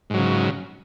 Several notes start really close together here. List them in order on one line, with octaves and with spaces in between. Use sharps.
G#2 F#3 C#3